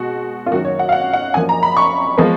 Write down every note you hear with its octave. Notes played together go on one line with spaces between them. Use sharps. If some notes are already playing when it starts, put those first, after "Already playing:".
Already playing: B2 G#3 F#4
F4
F#2 D#3 F#3 A#3 F#4
C#5
F#5
F5
F#5
F#5
F#2 F3 A#3 G#5
A#5
B5
C#6
F3 G#3 B3